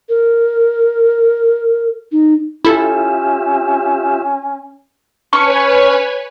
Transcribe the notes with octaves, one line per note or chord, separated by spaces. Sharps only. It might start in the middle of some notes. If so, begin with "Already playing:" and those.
A#4
D#4
C#4 E4 F4 G4 A4 E5
C#4 B4 C#5 G#5 C#6